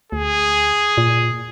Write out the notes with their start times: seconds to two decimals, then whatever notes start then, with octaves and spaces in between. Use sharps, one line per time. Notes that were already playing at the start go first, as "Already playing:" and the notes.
0.12 D2 G#4
0.98 A#2